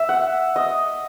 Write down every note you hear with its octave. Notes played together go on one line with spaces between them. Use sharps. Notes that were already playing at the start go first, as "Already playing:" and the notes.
Already playing: E5
F#5
D#5